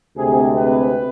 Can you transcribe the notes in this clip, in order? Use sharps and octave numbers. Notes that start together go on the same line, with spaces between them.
D2 C3 G#3 C4 G#4
B4